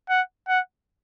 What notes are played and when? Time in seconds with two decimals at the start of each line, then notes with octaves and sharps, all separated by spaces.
0.09 F#5
0.48 F#5